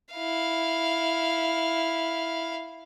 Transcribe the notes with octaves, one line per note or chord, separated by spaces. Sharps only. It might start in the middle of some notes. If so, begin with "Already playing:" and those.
E4 F5